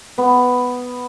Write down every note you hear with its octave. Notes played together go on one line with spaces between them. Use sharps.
B3